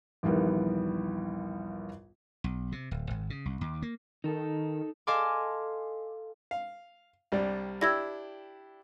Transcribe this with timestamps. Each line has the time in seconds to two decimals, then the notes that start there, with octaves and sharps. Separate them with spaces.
0.23 A#1 D#2 E3 G3 B3 A#4
2.44 B1
2.72 C3
2.91 D1
3.11 G#1
3.30 C#3
3.45 C2
3.61 D#2
3.82 A#3
4.24 D#3 D#4 A4
5.07 A4 D#5 F5 G#5 C6 D6
6.51 F5
7.32 C2 G3 D4
7.81 D4 E4 G4 E6 G#6 A#6